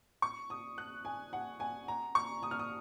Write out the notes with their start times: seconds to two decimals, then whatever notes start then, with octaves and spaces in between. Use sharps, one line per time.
0.22 C#6
0.50 D#6
0.78 F#6
1.05 G#5
1.33 F#5
1.60 G#5
1.88 A#5
2.15 C#6
2.43 D#6
2.51 F6
2.59 D#6